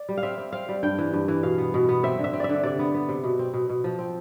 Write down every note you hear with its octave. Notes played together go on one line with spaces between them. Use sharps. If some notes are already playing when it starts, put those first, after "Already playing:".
Already playing: D5
G3
F5
C4 E5
C4
C4 F5
G3
G2 G5
E3
G2
E3
B2 F5
B3
B2
B3
C4 E5
D3
E5
C4
D5 E5
D3
C3 D5
B3
B3
C3
B2
C4
B2
B2
F3
C4